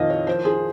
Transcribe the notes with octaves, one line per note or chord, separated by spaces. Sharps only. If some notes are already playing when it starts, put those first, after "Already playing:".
Already playing: F2 A#2 D#3 D#5 F5
C#5
F3 C5
G#4